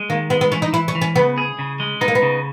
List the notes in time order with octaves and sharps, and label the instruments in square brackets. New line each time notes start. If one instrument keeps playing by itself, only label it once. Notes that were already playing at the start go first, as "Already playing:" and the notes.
Already playing: [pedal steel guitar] G#3
[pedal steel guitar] D#3 [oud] A#3
[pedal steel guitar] G#3 [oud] B3
[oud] B3
[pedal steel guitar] E3 [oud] C#4
[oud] D#4
[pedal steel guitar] E3 [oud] E4
[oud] C#4
[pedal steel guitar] E3
[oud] C#4
[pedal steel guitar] C#3 [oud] B3
[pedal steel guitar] G#4
C#3
G#3
[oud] B3 [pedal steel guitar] D#4
[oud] A#3
B3
[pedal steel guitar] C#3